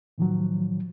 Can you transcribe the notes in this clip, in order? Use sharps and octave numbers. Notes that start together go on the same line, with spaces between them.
A2 D#3 F3 F#3